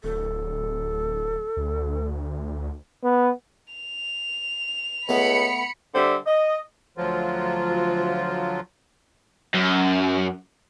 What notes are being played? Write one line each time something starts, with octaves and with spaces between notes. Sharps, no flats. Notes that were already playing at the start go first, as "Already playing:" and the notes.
D1 A4
D2
B3
F7
C#2 A3 B3 B5 C#7
D3 G3 C5 E5
D#5
D2 F3 F#3 F4
F#2